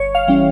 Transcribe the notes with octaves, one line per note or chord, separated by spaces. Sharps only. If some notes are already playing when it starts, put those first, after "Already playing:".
Already playing: G1 C#5
F5
E3 G3 C#4